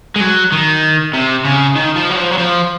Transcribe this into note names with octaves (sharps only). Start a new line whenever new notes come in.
G#3
F#3
D#3
C3
C#3
D#3
F3
F#3
F3
F#3
F3